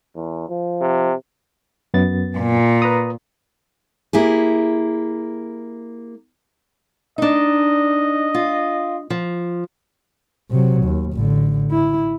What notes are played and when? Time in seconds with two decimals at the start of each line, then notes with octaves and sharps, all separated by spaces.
0.15 E2
0.49 F3
0.81 C3
1.94 F#2 B3 A6
2.37 A#2
2.82 B4 A#5 D#6
4.13 A#3 E4 G4 G#4
7.18 D4 D#4 D#5
8.35 F4
9.10 F3
10.51 C3 F#3
10.83 D#2
11.14 A1 D3
11.71 E4